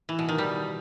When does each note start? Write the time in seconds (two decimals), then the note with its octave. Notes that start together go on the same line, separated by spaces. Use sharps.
0.09 E3
0.19 B2
0.29 D#3
0.38 G3